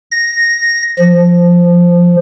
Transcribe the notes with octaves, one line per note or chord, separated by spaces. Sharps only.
A#6
F3